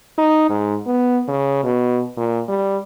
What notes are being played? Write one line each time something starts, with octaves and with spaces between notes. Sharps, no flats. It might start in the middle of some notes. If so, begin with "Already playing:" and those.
D#4
G#2
B3
C#3
B2
A#2
G3